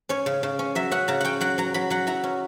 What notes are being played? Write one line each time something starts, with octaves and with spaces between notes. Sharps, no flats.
C#4 C#5
C#3
C#3
C#4
F#3 E5
C#4 F#5
C#3 A#5
C#4 F#5 G5
F#3 F#5
F#3 A#5
F#3 B5
F#3 F#5
E4 A#5
C#4